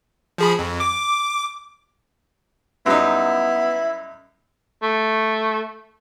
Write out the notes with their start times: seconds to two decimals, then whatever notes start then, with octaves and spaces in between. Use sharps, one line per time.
0.38 F3 G#4 B5
0.59 F2
0.80 D6
2.86 F#2 G3 B3 D#4 E4
4.82 A3